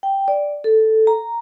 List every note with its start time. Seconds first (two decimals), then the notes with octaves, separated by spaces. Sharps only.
0.03 G5
0.28 D5
0.64 A4
1.07 A#5